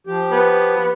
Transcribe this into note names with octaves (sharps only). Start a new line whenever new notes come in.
F3 G4
B3